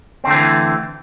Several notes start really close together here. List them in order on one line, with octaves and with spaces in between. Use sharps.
C4 D3 A3 E3